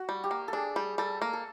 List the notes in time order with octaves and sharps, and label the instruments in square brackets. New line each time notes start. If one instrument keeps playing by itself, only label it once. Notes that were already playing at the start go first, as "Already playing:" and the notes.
Already playing: [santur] F#4
[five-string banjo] G3
[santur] G4
[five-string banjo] A#3
[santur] A4
[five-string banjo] D4 [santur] G#4
[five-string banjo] G3
[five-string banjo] G3 [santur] A4
[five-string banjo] A#3
[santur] A4